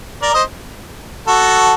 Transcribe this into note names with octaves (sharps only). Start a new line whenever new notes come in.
A#4 D5
C5 D#5
F#4 A4